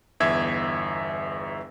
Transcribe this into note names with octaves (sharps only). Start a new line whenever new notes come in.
G1 E2 E5 G#6